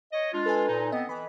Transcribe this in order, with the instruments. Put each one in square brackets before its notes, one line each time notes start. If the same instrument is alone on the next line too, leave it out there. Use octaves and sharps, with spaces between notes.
[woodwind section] C#5 D#5
G#3 D4 F4
[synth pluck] A4 B4 G#5
[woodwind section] A#2 D#4
[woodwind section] B3 C4 [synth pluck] D#5
[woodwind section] E3 [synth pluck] B5